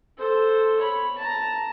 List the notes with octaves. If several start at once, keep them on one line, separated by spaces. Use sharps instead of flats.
A4 C5
C#5 B5
A5 A#5